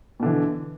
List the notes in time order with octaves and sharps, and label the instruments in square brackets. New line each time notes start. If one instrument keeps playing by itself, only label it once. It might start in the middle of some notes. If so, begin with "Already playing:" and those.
[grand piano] B2
D3
E3